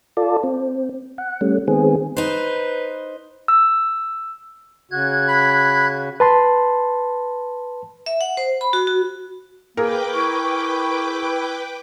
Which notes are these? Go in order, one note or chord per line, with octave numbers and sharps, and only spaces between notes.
F4 A4 D5
C4
F#5
G3 A3 C#4
D#3 G#3 B3 C4 G#4
D#4 B4 C5
E6
C#3 F#4 F#6 G#6
B5
B4 A5 C6
E5
F#5
C5
B5
F#4
F#4
A#3 G#4 A#4 B4 G5 D6
E4 C#6